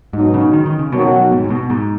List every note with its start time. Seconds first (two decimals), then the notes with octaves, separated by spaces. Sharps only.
0.13 G#2 B2 F#3 D#4
0.34 C#3
0.53 D#3
0.66 D#3
0.79 C#3
0.92 F#2 B2 D#3 F#3
1.32 G#2
1.44 G#2
1.50 B2
1.70 G#2